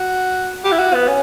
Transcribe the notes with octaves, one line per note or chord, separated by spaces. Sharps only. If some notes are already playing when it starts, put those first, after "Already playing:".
Already playing: F#4
G4
E4
F#4
B3
C#4